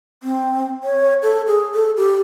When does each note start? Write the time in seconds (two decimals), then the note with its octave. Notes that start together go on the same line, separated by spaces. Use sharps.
0.23 C4
0.83 C#5
1.23 A4
1.47 G#4
1.74 A4
1.97 G4